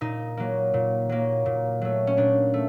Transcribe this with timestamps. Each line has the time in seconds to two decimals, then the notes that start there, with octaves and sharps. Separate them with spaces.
0.01 A#2 D#4
0.37 F#3 A#3
0.74 A#2
1.09 F#3 A#3
1.46 A#2
1.81 F#3 A3
2.07 C#4
2.17 A#2 D4
2.54 A3